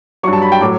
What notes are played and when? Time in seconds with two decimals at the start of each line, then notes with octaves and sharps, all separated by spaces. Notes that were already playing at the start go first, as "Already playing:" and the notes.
0.23 F#3 C#6
0.27 G2
0.33 A5
0.42 B5
0.52 G5
0.60 A2 F#3 D6